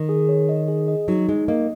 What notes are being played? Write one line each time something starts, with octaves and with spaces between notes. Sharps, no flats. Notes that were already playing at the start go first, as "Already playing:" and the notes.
Already playing: D#3
G#4
C#5
D#5
G#4
D#5
F#3 D#4
G#3 D#4
A#3 D#5